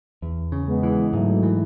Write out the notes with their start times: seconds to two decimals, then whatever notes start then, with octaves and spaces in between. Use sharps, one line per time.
0.22 E2
0.52 C#3
0.68 G#3 B3
0.83 E3
1.13 G#2 F#3 A3
1.43 E3